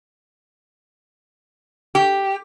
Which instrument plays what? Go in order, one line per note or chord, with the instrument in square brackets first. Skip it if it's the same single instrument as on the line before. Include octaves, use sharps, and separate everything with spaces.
[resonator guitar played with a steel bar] G4